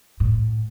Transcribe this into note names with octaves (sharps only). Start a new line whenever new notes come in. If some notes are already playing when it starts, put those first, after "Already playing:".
A2